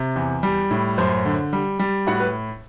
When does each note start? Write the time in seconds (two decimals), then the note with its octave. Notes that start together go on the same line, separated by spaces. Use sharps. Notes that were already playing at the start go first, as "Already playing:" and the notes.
Already playing: C3
0.16 E2
0.43 G3
0.71 A2
0.98 F#2 C5
1.25 D3
1.53 G3
1.79 G3
2.07 A2 F#4 F#5
2.20 B4